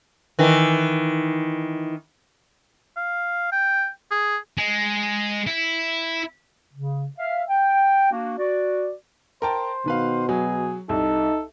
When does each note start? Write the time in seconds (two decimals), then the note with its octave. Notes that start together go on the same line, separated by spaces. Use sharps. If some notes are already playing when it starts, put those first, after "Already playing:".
0.39 D#3 E3
2.97 F5
3.52 G5
4.11 G#4
4.58 G#3
5.47 E4
6.74 C#3
7.18 E5 F5
7.49 G5
8.12 A#3 D4 F#4
8.38 F#4 D5
9.42 A#4 C5 G5 A5
9.86 B2 D#3 B4 F5
10.29 F#3 G#4
10.89 C2 D#4 A4